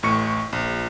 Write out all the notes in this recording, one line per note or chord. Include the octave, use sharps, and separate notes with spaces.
A1 A2 C#6 C#7
A#1